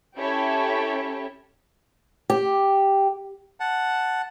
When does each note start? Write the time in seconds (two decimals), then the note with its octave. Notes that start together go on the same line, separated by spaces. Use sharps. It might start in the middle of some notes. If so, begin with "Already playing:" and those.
0.16 C#4 E4 G4 A4 C#5 E5
2.30 G4
3.60 F#5 A5